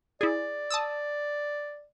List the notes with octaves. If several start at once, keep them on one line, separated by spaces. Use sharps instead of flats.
E4 G#4 D5
A5 D#6 E6